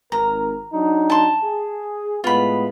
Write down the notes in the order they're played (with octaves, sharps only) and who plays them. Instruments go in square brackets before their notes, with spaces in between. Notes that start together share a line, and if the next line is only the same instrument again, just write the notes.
[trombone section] G#1 A#4 [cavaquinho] A#5
[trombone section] F#3 D4 D#4
[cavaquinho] A5 C6
[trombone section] G#4
[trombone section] A2 G#3 B3 [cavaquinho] F4 B5